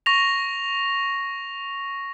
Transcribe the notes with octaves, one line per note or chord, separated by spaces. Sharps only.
C#6 A#6 F7